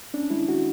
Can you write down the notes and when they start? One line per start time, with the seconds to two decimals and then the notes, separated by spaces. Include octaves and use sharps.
0.14 C#4 D4
0.30 G#3 E4
0.49 F#4